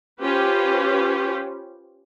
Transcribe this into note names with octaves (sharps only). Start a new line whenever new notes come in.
C#4 F4 G4 B4 C5